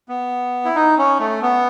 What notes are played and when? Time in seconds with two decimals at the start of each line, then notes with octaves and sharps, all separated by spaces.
0.09 B3
0.65 E4
0.75 D#4
0.98 C#4
1.19 A3
1.42 B3